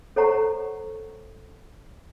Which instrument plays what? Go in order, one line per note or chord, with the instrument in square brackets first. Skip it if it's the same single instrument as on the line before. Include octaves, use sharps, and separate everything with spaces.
[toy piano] A4 C5 C#5 F#5 A#5 C#6